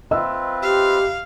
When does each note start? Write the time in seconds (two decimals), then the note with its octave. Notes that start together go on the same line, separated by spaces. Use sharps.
0.11 C4 F4 B4 D#5 E5 E6
0.62 G4 F5